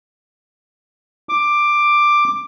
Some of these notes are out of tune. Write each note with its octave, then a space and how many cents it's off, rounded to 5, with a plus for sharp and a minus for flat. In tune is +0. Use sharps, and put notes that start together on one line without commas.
D6 +10